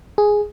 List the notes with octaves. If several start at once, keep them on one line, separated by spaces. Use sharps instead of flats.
G#4